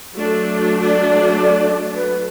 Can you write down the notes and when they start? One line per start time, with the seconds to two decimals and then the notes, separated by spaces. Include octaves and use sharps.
0.16 F#3 A3 D4
0.84 D5
1.95 B4